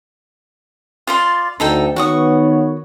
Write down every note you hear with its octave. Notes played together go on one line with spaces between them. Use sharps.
F4 D5 C6
D2 D#4 A4 G5
D#3 B3 F#4 C#5 C#6 D#6